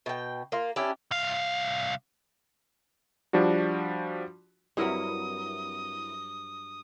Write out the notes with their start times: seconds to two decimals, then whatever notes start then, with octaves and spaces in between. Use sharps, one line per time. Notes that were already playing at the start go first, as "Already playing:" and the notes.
0.06 B2 G5
0.52 A#3 F4
0.76 C#4 D4 E4 G4
1.11 C2 F5
3.33 F3 G3 D4 F#4
4.77 G2 F#3 C4 E4 A#4 D#6